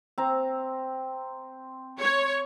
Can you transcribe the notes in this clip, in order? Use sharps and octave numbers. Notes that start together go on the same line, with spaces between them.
C4 A#5
C#5